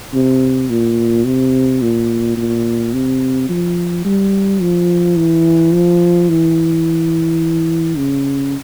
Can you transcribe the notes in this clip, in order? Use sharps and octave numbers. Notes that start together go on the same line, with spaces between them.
C3
A#2
C3
A#2
A#2
C3
F3
G3
F3
E3
F3
E3
C#3